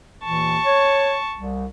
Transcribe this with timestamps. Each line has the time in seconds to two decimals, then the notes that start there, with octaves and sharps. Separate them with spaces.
0.24 D#2 A#2 E3 A5 C#6
0.66 C#5
1.37 C2